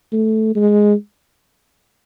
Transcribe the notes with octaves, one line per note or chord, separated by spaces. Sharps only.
A3
G#3